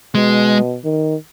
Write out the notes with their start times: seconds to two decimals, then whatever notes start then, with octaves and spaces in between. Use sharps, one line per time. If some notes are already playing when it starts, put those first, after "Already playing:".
0.15 B2 G#3
0.84 D#3